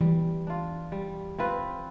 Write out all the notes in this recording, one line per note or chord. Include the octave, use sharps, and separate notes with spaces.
E3 G3
D4 F4
G3
C4 F4 B4